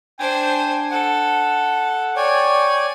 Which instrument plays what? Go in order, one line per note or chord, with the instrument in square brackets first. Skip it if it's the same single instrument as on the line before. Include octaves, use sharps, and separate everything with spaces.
[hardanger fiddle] D4 C5 [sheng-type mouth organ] G5 G#5
[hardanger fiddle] A4 [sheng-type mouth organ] F#5
[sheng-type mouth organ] C#5 D5 G5 [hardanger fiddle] G#5